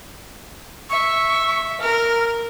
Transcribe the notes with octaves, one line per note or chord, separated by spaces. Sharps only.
E5 C#6
A#4 F6